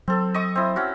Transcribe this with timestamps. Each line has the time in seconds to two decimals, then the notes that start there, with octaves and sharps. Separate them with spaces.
0.08 F#3 C4 A4
0.34 D#5 C#6 D#6
0.55 C4 E4
0.76 C#4 F#4